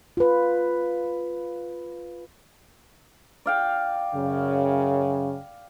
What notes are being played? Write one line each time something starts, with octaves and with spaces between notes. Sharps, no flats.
F4 B4
D5 F5 G5
F#2 C#3